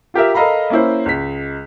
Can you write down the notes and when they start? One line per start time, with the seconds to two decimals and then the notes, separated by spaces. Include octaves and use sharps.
0.14 F4 G4 A#4 E5
0.34 A4 A#4 D#5 F5 A#5 B5
0.70 A#3 C#4 E4 C5
1.06 C#2 B6